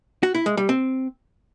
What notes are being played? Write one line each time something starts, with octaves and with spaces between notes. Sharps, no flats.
F#4
E4
G#3
G3
C4